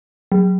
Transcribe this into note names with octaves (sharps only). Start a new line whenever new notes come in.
F#3